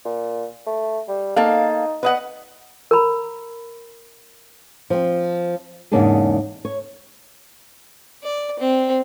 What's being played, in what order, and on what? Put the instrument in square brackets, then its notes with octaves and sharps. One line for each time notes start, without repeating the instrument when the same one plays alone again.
[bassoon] A#2
A3
G3
[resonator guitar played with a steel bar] A#3 A4 F5 [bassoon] D#4
[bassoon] B3 [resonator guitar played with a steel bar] B4 D#5 F#5
[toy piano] A#4 A#5 B5
[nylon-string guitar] F3 C4
E2 G#2 C#3 A#3 D4 G#4
C#5
[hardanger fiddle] D5
C4